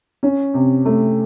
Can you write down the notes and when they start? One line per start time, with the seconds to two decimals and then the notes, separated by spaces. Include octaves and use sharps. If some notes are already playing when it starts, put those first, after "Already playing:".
0.23 C#4
0.54 C3
0.85 A3